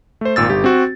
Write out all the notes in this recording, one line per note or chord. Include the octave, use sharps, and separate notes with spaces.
A3 C5
G#1 A#2 E6 A6
G1 G4
C4 F#4